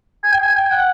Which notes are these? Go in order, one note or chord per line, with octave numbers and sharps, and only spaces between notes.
G#5
G5
G#5
G5
F#5